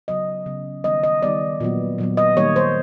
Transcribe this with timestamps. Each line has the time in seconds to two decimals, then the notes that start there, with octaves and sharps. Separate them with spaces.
0.08 C#3 F#3 B3 D#5
0.46 C#3 F#3 B3
0.84 D#3 G3 B3 D#5
1.03 D#5
1.22 D#3 G3 B3 D5
1.60 A#2 F#3 B3
1.98 A#2 F#3 B3
2.17 D#5
2.37 D#3 G3 A#3 C#5
2.56 C5